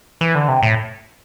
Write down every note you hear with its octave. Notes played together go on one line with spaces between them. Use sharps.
E3
D3
C3
A2